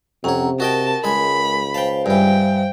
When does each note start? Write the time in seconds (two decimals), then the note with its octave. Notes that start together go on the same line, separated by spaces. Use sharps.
0.24 F2 C3 C#4 C#5 F#5 A#5
0.60 F#4 A#4 D#5 G5 A5
1.04 C#2 G#3 G#5 B5
1.74 C5 F5 G5 A5
2.06 G2 E3 G5